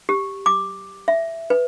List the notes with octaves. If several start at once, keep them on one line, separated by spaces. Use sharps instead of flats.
G4
D6
E5
B4